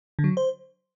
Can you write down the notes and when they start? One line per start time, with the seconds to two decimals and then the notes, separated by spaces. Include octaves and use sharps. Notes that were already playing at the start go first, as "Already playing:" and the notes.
0.19 D3
0.24 F#3
0.37 C5